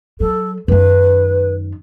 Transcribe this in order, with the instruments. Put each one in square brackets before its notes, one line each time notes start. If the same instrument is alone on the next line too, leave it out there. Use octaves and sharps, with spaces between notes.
[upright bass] F#3 [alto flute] A4
[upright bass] F#2 D#3 [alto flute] B4